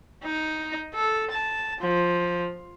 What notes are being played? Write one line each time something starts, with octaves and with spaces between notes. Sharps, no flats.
D#4
A4
A5
F3